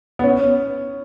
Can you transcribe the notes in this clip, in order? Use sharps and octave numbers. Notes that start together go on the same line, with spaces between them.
B3
C#4